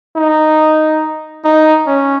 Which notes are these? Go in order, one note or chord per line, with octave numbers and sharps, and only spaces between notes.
D#4
D#4
C#4